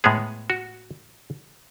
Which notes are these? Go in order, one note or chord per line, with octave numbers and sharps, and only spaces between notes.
A2 G#3 B3 G#4
F#4